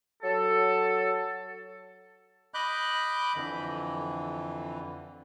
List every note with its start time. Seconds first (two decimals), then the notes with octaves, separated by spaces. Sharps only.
0.23 F#3 A4
2.54 D#5 B5 D6 F#6 G6
3.36 F2 D3 E3